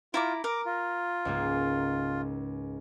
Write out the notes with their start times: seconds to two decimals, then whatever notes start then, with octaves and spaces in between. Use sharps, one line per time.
0.14 E4 F4 A#5 D6
0.44 A#4 D6
0.66 F4
1.25 C#2 G#2 A#3